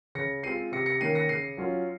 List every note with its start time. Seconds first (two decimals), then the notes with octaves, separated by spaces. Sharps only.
0.15 C#3 A#6 C#7
0.43 G#3 C4 F4 C7 D#7
0.72 C3 A#6 C#7
0.86 A#6 C#7
1.00 D#3 A#3 C#4 C7 D#7
1.15 A#6 C#7
1.29 C#3 C7 D#7
1.58 F#3 C#4 F4